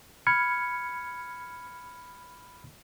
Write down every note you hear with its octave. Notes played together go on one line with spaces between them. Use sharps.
B5 F6 G#6 C#7